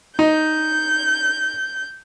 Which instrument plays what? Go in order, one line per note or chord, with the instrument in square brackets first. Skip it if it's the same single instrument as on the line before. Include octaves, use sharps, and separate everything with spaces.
[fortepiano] D#4 [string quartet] G6